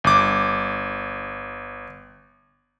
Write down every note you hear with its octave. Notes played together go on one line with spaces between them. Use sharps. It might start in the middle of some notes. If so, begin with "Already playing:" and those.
G1 D6